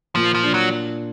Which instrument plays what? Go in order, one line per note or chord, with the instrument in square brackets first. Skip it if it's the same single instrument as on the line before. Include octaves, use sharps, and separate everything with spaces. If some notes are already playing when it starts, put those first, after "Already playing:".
[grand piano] A#2 [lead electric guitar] F3
[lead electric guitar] F3
[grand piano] D4
[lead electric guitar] F#3